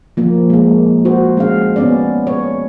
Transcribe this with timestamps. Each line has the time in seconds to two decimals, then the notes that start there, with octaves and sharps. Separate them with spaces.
0.17 F3 A#3
0.50 G#3 A#3
1.05 F#4 C5
1.37 G#3 C#4 F5
1.76 B3 C#4 D5
2.27 C#5